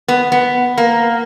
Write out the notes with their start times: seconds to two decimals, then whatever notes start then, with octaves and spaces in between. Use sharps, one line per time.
0.08 B3
0.32 B3
0.78 A#3